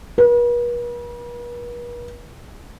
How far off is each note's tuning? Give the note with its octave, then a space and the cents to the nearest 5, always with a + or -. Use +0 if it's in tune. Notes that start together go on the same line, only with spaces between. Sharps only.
B4 -45